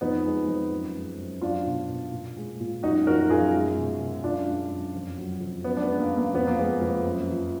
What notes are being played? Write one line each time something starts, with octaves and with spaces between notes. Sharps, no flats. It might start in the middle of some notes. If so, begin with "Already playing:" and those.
F2 B3 D#4
G#3
F2
F#2
G#3
F#2
F#3 D4 F4
B2
B2
A#2
G#3
A#2
F#2 D#4 F#4
F3 F#4 A#4
F#2 F4 G#4
G#3
B2
B2
F#2 D4 F4
G#3
F#2
F2
F#3
F2
F#2 B3
D4
B3
G#3
A#3
F#2
A#3
F2 B3
A#3
G#3 B3
F2
F#2
F3